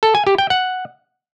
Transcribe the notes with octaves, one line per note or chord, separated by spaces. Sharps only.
A4
G#5
G4
G5
F#5